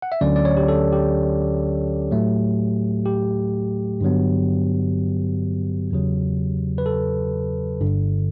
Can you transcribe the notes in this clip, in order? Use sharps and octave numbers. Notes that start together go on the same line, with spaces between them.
F#5
E5
D2 D3 F#3 C#4 D5
D5
C#5
G4
A4
G4
A2 F#3 A3
G4
G2 D3 F#3 B3
E2 C#3 F#3
B4
A4
G1 G2 D3